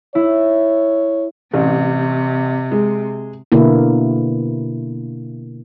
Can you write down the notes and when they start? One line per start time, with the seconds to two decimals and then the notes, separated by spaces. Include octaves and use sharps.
0.15 E4 C#5
1.54 A1 C3
2.71 G#3
3.52 B2 D3 A#3 E4